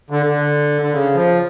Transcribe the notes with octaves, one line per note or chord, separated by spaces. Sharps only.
D3
D3
D3
C#3
F3